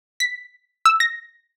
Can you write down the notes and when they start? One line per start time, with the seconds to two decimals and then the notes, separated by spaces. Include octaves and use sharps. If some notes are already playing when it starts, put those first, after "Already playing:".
0.20 B6
0.85 E6
1.00 A#6